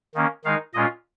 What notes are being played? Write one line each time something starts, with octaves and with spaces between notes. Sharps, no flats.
D#3 A#3 C#4
D#3 G#3 D#4 F5
A#2 G#3 C#4 F4 D#5